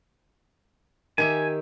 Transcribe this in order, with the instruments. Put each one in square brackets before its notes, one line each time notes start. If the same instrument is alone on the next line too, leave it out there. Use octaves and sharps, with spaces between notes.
[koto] D#3 G4 E5 [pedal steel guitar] G#5